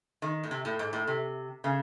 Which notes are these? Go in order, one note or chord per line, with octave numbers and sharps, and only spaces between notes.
D#3
A2
C3
A2
G#2
A2
C3
C#3